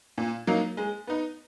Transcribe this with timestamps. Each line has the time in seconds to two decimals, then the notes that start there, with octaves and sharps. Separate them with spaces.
0.18 A#2
0.47 F#3 A#3 D#4
0.77 G#3
1.07 B3 D#4